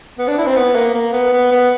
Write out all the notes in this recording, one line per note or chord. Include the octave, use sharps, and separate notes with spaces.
B3
D4
E4
C4
B3
A#3
A#3
B3
B3
B3